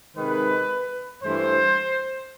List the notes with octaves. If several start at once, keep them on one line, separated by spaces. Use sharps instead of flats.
C3 D#3 G#3 B4
G2 E3 A3 C5